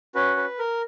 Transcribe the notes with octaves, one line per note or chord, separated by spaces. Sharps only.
C#4 F#4 B4
B4
A#4